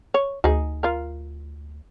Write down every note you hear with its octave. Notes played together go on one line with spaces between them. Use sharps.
C#5
D2 D#4 G#4
F4 A#4